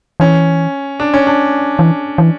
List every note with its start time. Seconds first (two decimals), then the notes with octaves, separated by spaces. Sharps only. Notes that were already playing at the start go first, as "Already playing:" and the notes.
0.20 E3 C#4
1.00 D4
1.14 C#4
1.27 D4
1.79 E3
2.18 E3